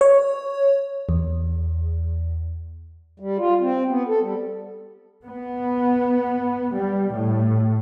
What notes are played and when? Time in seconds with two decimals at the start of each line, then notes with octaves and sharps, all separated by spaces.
0.01 C#5
1.09 E2
3.20 G3
3.38 F4
3.61 C4
3.88 B3
4.08 A4
4.22 G3
5.24 B3
6.74 G3
7.13 A2